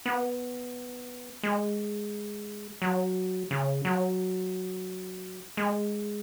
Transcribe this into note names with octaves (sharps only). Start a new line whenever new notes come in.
B3
G#3
F#3
C#3
F#3
G#3